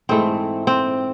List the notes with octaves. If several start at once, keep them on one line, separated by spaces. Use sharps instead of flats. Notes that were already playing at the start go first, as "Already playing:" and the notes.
G#2 E3 A3 C4
C4